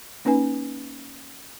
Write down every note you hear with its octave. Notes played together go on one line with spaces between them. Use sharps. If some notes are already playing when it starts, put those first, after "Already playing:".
A#3 C#4 D#4 B4 G#5